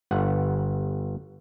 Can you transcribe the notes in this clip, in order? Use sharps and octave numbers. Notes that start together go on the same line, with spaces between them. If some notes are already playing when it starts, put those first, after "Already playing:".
G1 F#5